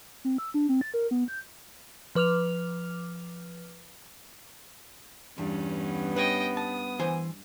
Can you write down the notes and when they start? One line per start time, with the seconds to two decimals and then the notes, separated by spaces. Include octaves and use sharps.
0.25 C4
0.38 E6
0.54 D4
0.69 C4
0.81 A6
0.94 A#4
1.11 B3
1.28 G6
2.15 F3 B4 D6 F6 F7
5.38 E2 G2 C#4
5.71 B3
6.16 B4 C#5 D#5 G5
6.57 A5 D#6
6.99 E3 C5 G#5